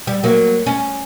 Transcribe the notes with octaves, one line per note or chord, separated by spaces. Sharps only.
G3
F#3 A#3
C#4